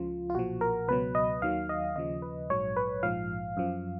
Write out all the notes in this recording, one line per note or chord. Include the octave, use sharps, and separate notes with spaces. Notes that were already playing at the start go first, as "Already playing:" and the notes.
Already playing: C#2 C#3 F3 F4
F4
B1 A#2 F3 F#4
A#4
C#2 B2 F#3 B4
D#5
D#2 D#3 F#3 F5
D#5
D#2 C#3 F3 D#5
B4
A#1 G#2 F#3 C#5
B4
A#1 G#2 F3 F5
F#2 F3